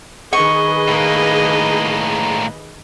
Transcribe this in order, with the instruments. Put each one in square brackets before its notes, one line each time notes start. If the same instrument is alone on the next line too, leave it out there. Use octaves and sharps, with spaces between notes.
[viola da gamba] D#3 D#5 [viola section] G#4 B4 [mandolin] C#6
[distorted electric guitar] A2 A#3